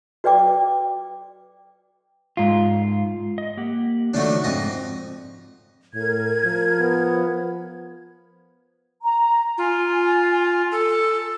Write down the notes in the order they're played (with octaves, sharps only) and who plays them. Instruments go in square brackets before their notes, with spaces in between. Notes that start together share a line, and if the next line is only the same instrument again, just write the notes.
[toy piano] F#4 B4 D5 G5 D6
[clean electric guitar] G#2 F4
[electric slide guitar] D#5
A#3 G4 F#5
[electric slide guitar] D#3 F3 D#4 [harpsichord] F#3 A3 D4
[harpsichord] F2 D#5 [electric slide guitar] G#2
[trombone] A2 [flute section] A#4 G#6
[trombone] F3
[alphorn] B3
[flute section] A#5
[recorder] F4 [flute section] G#5
[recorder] A4